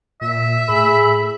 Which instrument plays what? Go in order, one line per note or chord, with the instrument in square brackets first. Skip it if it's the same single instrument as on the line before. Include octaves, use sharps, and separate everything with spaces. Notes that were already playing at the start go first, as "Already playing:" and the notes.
[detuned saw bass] A#2 [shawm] E5
[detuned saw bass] A2 [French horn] G#4 [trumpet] B5